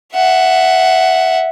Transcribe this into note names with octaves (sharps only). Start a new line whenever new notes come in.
E5 F#5